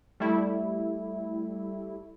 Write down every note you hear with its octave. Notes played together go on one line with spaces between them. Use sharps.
G3 A3 E4